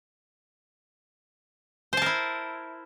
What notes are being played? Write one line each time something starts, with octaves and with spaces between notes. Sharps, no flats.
E4 A#4 C5 A5